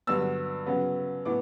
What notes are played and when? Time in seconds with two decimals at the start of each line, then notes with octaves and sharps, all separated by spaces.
0.07 G2 D3 F#3 B3 E6
0.66 C#3 F#3 B3
1.25 A2 B3 D6